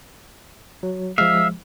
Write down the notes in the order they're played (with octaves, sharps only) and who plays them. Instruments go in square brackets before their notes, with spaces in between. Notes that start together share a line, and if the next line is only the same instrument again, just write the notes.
[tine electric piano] F#3
[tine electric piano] F3 G#3 [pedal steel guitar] E5 [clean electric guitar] F5